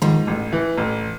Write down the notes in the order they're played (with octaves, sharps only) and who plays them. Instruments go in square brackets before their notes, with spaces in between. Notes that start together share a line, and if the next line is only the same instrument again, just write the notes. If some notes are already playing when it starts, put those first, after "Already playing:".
[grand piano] G#2 [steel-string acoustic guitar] D#3 F3
[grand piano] A1
E3
A1